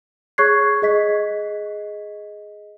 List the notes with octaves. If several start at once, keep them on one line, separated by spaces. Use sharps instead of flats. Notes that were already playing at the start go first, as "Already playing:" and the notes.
G#4 C#5 C#6 F#6 G#6 C7
G#4 D#5 B6